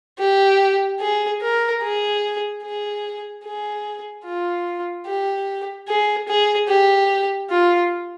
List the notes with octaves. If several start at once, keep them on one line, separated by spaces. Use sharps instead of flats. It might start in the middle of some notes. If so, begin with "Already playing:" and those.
G4
G#4
A#4
G#4
G#4
G#4
F4
G4
G#4
G#4
G4
F4